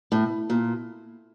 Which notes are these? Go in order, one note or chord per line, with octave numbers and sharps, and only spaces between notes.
A2
A#2